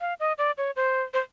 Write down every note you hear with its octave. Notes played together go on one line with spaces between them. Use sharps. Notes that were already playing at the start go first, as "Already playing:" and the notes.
F5
D#5
D5
C#5
C5
C5